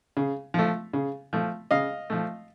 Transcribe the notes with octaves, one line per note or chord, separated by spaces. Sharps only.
C#3
F3 A3
C#3
F3 A3
C#3 D#5 F5
F3 A3